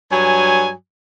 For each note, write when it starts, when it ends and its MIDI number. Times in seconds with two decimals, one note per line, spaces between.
0.11 0.72 43
0.11 0.72 54
0.11 0.72 80